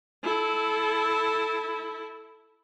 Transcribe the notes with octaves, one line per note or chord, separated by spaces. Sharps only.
E4 A4